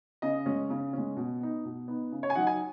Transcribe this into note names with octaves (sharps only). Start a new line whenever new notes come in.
C#3 D#5
G#3 C#4
C#3
G#3 C#4
B2
B3 D#4
B2
B3 D#4
C#3
C#5
G#5
F#3 D#4 F#5
G#5